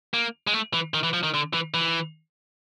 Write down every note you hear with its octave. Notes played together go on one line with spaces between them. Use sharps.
A#3
G#3
A3
E3
D#3
E3
F3
D#3
D3
E3
E3